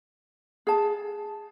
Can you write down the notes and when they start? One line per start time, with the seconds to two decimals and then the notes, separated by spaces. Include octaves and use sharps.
0.67 G#4 A5